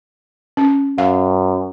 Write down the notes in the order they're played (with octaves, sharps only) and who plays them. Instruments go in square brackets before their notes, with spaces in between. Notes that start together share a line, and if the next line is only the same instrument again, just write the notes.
[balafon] C#4
[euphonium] F#2 [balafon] F5